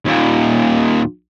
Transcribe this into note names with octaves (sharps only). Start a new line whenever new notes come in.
D#2 A#2